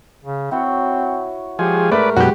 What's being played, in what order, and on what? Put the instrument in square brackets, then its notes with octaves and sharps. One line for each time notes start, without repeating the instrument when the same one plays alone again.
[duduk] C#3
[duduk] C4 [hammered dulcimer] E4 F#4 C#5
[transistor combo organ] F3 G#4 [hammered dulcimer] G#3 C#6 D6 [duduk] G4
[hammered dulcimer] G#2 [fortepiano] A3 [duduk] A#4 [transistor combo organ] B4 D5
[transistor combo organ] F#2 B2 [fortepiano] F#4 G4